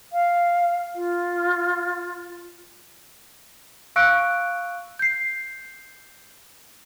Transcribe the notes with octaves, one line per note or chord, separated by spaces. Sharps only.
F5
F4
F5 C#6 E6 F#6 C#7 D7
G6 C7